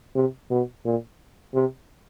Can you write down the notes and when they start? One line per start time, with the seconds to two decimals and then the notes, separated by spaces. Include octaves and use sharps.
0.15 C3
0.51 B2
0.85 A#2
1.54 C3